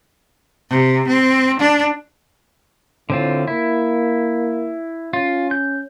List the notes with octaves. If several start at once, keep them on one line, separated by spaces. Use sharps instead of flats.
C3
C4
D4
A2 D3 C4 F4
A#3 E4
C#4 F4
G6